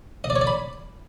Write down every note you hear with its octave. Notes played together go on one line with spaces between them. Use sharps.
D#5
D5
C#5
D5
B5